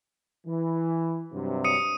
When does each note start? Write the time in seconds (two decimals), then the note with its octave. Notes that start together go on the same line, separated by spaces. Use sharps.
0.46 E3
1.32 G2 C3 F#3
1.64 D#6 C#7 D#7